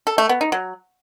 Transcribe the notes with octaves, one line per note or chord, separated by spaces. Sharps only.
A4
A3
B3
D#4
F#3